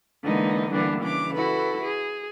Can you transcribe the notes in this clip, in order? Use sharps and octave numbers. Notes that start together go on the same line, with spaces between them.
D3 E3 G#3 A#3 B3 D#4
D3 E3 G3 A#3 B3 D4
C#3 E3 D4 D6
E4 F#4 A4 B4
G#4